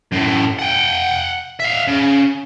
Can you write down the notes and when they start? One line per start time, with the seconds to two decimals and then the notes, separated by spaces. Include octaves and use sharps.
0.12 F#2 A2
0.59 F#5 G5
1.60 E5 F5
1.88 C#3